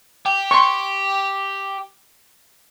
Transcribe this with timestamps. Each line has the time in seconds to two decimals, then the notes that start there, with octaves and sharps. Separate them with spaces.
0.26 G4
0.51 C6 C#6